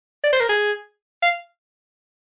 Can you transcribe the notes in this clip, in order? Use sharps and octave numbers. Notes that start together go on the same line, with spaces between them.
D5
C5
A#4
G#4
F5